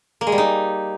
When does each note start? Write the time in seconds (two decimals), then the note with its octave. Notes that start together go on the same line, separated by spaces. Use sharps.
0.21 A#3
0.27 G#3
0.32 G3
0.38 D#4